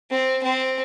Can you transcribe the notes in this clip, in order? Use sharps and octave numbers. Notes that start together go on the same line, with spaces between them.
C4
C4